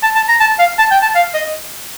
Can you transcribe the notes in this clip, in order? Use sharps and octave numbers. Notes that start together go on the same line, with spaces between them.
A5
A5
A#5
A5
F5
A5
G5
A5
F5
D#5